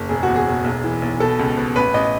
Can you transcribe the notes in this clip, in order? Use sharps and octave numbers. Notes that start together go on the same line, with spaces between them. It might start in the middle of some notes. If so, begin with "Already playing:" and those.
Already playing: F#1
E1 G#4
E2 F#4
G#4
E1
B1
E3
B1
B2 A4
C#2
B2
A1 B4
A1 D#5